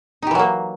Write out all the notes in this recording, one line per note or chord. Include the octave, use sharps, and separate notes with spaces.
E3 F#3 A#3 D#4 G4